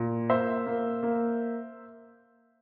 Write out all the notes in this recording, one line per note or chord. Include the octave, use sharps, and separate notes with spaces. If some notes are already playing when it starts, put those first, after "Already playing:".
Already playing: A#2
A#3 C5 E5
A#3
A#3